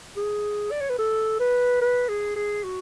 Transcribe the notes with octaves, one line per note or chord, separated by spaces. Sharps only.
G#4
D5
C#5
B4
A4
B4
B4
G#4
G#4
F#4